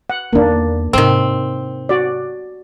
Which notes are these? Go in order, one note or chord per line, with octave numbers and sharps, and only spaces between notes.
F#5
E2 A#3 D4 D#4
G#2 C3 D#3 C4
F#4 D5